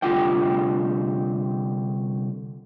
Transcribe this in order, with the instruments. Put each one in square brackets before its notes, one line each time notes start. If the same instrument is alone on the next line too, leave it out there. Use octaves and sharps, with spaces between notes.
[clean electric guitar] C2 D3 F4 G4 F#5 G5